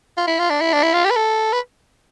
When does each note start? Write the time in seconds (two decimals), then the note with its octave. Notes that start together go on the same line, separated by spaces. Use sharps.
0.17 F4
0.27 E4
0.39 F4
0.50 D4
0.61 E4
0.73 D4
0.83 E4
0.94 F4
1.05 G4
1.11 B4
1.16 A4
1.53 B4